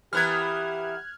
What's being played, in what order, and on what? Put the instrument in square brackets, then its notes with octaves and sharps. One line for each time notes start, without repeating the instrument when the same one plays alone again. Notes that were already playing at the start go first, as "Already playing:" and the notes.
[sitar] E3 B3 A#4 [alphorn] G4 [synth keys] F6 F#6 G#6